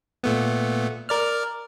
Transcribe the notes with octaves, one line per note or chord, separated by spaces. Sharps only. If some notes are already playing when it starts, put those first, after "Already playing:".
A#2 A3 B3
A#4 D5 F6